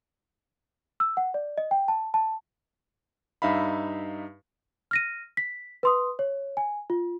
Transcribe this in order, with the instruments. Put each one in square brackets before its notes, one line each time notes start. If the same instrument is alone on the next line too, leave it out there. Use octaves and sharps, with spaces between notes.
[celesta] E6
F#5
D5
D#5
G5
A5
A5
[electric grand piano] G2 D#4 E5 F5 B5
[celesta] F6 A#6 D#7
B6
B4 C6 D#6
C#5
G#5
F4